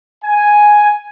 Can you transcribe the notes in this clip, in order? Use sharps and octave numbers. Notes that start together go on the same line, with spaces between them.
G#5